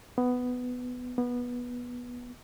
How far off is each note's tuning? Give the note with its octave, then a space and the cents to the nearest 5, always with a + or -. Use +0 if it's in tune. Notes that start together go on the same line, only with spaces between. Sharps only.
B3 +10
B3 -15